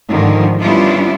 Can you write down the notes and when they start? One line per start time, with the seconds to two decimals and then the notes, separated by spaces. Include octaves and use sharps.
0.10 G#2 D3 D#3 F3
0.61 G3 B3 C#4 D4 E4 F4